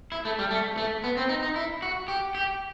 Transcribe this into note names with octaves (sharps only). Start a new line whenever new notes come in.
E4
A3
G3
A3
A3
B3
C4
D#4
D#4
E4
F#4
G4
G4